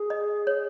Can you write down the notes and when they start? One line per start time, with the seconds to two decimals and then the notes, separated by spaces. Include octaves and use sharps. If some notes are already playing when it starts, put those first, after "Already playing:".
Already playing: G#4
0.10 D#5
0.47 C#5